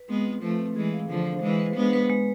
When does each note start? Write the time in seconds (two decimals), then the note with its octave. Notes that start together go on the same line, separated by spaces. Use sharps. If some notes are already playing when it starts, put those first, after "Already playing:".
Already playing: B4
0.09 G#3 B3 C4
0.26 F4
0.42 F3 A3 B4
0.59 C4
0.76 E3 G#3 G#4
0.93 F5
1.09 D3 F3 F5
1.26 C5
1.42 E3 G#3 B4
1.59 B4
1.76 G#3 B3 D4
1.93 B4
2.10 G#3